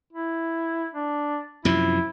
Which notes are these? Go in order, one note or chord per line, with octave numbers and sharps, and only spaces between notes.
E4
D4
F#2 C3 F3 E4